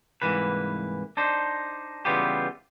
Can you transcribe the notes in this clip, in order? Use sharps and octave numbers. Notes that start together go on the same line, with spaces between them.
C2 G#2 E3 A#3 B4
D4 D#4 C5
C#3 E3 G3 B3 F4 G4